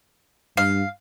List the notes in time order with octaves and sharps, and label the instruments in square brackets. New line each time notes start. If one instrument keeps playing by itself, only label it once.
[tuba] G2 [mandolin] F5